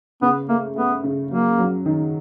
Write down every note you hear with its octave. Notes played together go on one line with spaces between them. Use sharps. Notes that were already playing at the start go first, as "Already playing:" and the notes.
C#3 B3
A3 A#3
A3 B3
C#3
F#3 A#3
F#3
D#3